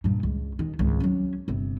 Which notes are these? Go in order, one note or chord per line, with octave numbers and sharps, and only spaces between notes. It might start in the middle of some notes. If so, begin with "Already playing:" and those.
G2 A#2
C#2
D#2 D#3
G#1 C#2
F#3 C#4
G1 C3